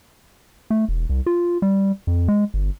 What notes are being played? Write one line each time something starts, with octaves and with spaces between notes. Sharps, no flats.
A3
E1
C2
F4
G3
F2
G#3
G1